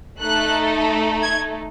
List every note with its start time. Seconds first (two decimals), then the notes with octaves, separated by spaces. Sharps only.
0.21 A3 D#4 A4 F#6
1.22 G#6